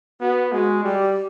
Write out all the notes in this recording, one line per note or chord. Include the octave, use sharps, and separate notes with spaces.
B3 F#4
G#3 F#4
G3 G4